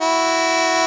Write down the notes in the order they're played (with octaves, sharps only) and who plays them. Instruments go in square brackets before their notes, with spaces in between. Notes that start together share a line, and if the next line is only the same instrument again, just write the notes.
[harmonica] E4 F#4